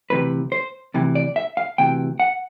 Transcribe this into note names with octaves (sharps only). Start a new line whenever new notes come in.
D2 C3 E3 B4
C5
D2 C3 E3
D5
E5
F5
D2 C3 E3 G5
F#5